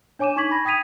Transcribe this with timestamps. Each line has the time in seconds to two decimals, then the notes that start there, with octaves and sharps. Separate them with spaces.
0.19 D4 C#5 G#5 D6 D#7 E7
0.36 D#4 C#6 D6 G#6 B6 F#7
0.51 B5 G#6 A#6
0.65 G5 D#6 G#6 B6 D#7 F7